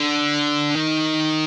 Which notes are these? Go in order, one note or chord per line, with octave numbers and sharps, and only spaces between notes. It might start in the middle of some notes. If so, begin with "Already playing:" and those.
Already playing: D3
D#3